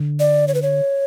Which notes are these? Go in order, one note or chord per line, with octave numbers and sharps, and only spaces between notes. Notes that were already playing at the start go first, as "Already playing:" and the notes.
Already playing: D3
D5
C#5
B4
C#5